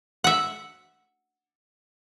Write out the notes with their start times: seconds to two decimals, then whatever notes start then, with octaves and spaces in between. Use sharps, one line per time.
0.24 E5 F#5